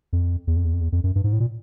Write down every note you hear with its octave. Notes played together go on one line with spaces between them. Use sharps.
F2
E2
F2
E2
F2
E2
F2
F#2
G2
G#2
A2
A#2